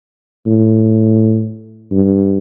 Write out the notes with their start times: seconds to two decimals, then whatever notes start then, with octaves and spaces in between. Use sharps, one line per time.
0.47 A2
1.92 G2